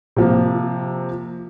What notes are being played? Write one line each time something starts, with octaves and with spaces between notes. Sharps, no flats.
C3 F3 A#3